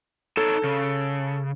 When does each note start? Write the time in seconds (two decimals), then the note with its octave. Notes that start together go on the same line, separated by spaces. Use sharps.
0.37 D#4 A4 C#5 A5
0.64 C#3